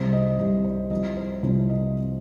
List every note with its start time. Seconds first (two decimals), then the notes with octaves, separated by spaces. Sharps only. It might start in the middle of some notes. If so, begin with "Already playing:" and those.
Already playing: C2 C3 G3 C5
0.13 D#5
0.39 C2 C3 G3 D#5
0.65 C5
0.91 C2 C3 F3 D#5
1.17 C5
1.43 C2 C3 F3 C5
1.70 D#5